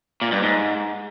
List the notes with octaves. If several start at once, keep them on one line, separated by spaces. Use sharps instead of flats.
A#2
G2
G#2